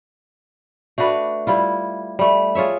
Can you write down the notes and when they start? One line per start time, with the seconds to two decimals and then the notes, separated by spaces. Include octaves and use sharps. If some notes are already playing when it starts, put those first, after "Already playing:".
0.98 A3 D4 F#4 B4
1.47 G3 E4 F4
2.19 G3 A3
2.55 F4 G#4 C#5 E5